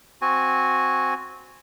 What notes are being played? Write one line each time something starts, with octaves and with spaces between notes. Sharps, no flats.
C4 F#4 G#5